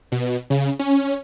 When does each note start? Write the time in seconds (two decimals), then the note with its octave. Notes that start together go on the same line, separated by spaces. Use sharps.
0.12 B2
0.50 C#3
0.79 C#4